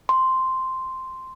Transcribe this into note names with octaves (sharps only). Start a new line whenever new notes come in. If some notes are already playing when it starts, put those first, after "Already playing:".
C6